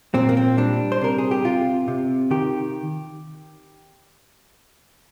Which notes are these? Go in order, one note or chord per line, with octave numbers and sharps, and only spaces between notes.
A#2 C4
A#3
C4
G3 D4
C5
C3 A#4
G#4
G4
C3 F4
C3
D#3 G4